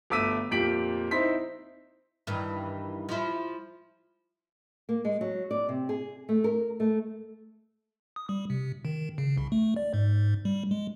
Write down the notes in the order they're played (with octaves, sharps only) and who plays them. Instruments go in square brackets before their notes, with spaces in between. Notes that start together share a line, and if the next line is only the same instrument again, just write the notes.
[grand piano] G1 A3 D6 E6 B6 D#7
F2 A#2 G4 B6 D7 F#7
C4 D#4 E4 C6 B6
[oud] G2 D#3 E3
F3 E4
[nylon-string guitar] A#3
G#3
F#3
D5
C3
G#4
A3
A#4
A3
[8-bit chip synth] D#6
G3
C3
D#3
C#3
C2
A3
D5
G#2
G3
G#3